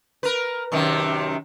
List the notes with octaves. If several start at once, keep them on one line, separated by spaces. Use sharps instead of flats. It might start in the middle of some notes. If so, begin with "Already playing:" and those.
A#4 B4
F#2 C3 D#3